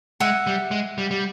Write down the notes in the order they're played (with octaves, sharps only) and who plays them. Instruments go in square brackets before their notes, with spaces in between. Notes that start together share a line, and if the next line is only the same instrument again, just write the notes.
[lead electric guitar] G#3 [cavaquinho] E5 F#5
[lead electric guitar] G3
G#3
G3
G3